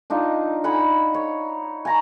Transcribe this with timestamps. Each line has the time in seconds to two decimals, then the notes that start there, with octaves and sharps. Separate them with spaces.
0.10 D4 D#4 F4
0.64 D#4 F#5 G#5 B5
1.14 C#5
1.85 G#5 A#5 C#6